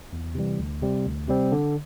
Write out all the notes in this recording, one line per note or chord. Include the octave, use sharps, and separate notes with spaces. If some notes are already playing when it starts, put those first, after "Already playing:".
E2
C3 E3 G3
D2
C3 G3 C4
D2
C3 G3 C4
D3